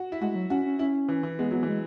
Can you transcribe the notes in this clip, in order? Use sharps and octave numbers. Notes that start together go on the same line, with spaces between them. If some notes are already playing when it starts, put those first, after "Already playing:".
Already playing: F#4
E4
G#3 F#4
G#3
F#3
C#4 F#4
C#4
C#4 E4
E3
E3
G#3 B3
F#3 B3
E3
G#3